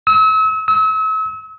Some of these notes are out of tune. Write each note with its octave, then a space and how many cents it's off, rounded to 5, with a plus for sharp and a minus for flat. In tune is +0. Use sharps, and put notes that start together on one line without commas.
E6 -40
E6 -40